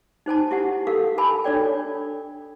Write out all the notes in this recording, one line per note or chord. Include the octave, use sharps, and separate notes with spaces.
D#4 C5 G#5 A5
E4 G4 F#5
G4 A4 A#4 F5
A#4 G#5 A5 B5
D4 A4 C#5 D5 G5